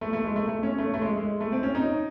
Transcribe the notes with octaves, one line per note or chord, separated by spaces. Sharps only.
A3
A3
G#3
A3
A3
C#4
A3
A3
G#3
G#3
A3
C4
C#4
D#4